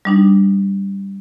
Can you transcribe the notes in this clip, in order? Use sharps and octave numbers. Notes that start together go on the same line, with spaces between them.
G3 D4 D#4